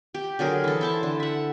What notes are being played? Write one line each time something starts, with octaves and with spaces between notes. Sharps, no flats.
G4
D3 F#3 G#4 A#4
E3 A4
E4 C5 A5
D3
E5 F#5